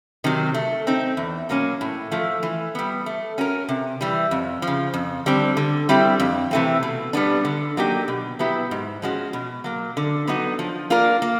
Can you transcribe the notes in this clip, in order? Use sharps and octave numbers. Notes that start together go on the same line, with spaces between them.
C3 D#3 F#3
A3
C4 D#4
E2
B2 F#3 A#3 C#4
A2
F3 A3
E3
G3 B3
A3
C#4 F#4 A#4
C3
E3 G3
F2
F3
C#3
F2
D3 G3 C4
D3
G3 C4 E4 G4
F2
C3 E3 A3 C4
B2
G3 B3 D4
D3
F#3 A#3 D#4 G4
B2
F#3 B3 E4 G4
G#2
F3 G#3 C#4 F#4
B2
F#3 A#3
D3
F#3 B3 D#4 F#4
F3
A#3 D4 F4 A#4
A#3